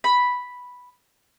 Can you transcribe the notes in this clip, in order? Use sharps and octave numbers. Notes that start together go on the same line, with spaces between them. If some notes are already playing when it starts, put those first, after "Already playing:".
B5